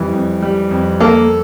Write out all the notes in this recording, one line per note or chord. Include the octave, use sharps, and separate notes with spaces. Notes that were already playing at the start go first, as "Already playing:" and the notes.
Already playing: F2 E3 G3
F2
G3
F2
A#3 A4